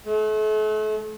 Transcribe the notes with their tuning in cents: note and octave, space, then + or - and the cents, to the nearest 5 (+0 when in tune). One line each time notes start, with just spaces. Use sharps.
A3 -40